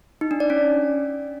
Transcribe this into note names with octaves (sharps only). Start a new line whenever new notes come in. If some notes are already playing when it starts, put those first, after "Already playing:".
D#4
D4
D5
C#4